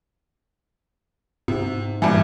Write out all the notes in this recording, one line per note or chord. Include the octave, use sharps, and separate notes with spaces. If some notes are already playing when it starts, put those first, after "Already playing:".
G#2 C3
G2 A#2 E3